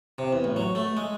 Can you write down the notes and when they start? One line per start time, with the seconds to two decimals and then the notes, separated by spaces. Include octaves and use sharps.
0.18 C3
0.33 E2
0.44 A1
0.56 F#3
0.75 A3
0.97 G#3